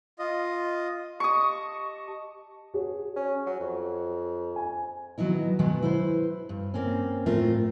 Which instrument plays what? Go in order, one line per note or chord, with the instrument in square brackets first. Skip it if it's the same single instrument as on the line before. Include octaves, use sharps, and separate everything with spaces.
[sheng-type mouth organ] F4 D#5
[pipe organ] G4 D#5 A5 [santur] C#6 D#6
[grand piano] F#4 G#4 C#5
[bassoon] C#4
F#3
F2
[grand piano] G#5
[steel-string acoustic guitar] D#3 F#3 B3 D#4 E4
B2 D#3 F#3 G#3 B3
E4 B4 C5
G2
A#3 C4 C#4
A2 A3 C4 F4 A#4 E5